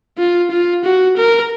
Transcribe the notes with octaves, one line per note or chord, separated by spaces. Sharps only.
F4
F4
F#4
A#4